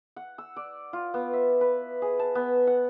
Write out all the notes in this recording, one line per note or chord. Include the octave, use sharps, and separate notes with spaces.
F#5
E6
D5
F4
B3
E5
B4
G#4
A5
B3
F#5